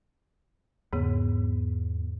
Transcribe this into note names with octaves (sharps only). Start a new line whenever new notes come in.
E2 G#2 C#3 B3